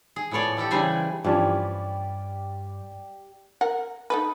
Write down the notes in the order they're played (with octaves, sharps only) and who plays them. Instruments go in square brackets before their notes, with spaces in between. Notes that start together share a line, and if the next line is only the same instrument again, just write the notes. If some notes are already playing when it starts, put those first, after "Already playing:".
[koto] G#4
A2 F3 B3 C#5 D5
B3 E4 G4 A4
C#3 E3 G3 D4 C5 G#5
[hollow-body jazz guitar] G2 [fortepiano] E3 F3 C#4 [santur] G4 D5 D6
[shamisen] A#4 F#5
D#4 A4 B4